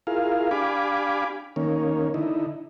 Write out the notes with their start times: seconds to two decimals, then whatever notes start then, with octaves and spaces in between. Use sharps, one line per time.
0.07 E4 F4 G#4 A#4 F5
0.51 D4 G4 F5 G#5 B5 D6
1.56 D#3 A#3 C#4
2.14 D3 D#4 E4